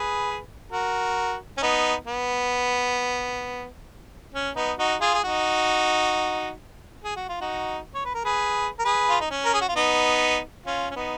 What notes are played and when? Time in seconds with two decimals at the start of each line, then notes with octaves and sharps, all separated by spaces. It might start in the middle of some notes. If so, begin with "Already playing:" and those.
Already playing: G#4 B4
0.72 F#4 A#4
1.58 C#4
1.62 B3 D#4
2.07 B3
4.34 C#4
4.56 B3 D#4
4.79 D#4 F#4
5.01 F4 G#4
5.14 G#4
5.24 D#4 F#4
7.04 G#4
7.16 F#4
7.29 F4
7.41 D#4 F#4
7.95 C#5
8.05 B4
8.14 A#4
8.25 G#4 B4
8.79 A#4
8.85 G#4 B4
9.10 F4
9.21 D#4
9.30 C#4
9.45 A#4
9.54 G#4
9.61 F#4
9.68 F4
9.75 B3 D#4
10.66 C#4 F4
10.90 C#4
10.96 B3 D#4